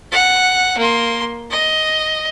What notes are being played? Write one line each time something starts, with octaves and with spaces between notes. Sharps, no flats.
F#5
A#3 C6
D#5